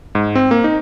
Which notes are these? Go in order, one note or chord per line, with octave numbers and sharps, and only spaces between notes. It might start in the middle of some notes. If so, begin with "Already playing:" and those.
G#2
C4
A#3
D#4